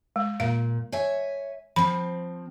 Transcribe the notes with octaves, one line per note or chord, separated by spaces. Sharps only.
G#3
A#2 F5
C#5 E5 G#5
F3 C4 B5